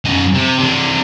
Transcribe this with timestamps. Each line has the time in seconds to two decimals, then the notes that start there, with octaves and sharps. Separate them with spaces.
0.05 F#2 D#5
0.34 C3
0.59 C3 D4